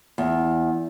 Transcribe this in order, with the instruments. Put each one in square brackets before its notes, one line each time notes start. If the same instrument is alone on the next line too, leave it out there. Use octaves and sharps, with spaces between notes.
[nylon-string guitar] E2